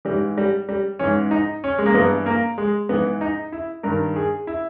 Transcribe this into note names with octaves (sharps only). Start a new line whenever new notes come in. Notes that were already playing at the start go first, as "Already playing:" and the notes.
G#2 E3 G3
G3
G3
G#2 E3 C#4
D#4
C#4
G#3
A#3
G2 E3 B3
A#3
G#3
G#2 E3 B3
D#4
E4
G2 D#3 A#4
G#4
E4